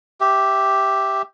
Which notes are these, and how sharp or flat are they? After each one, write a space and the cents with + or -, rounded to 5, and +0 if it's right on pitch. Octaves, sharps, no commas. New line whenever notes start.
G4 +0 E5 +0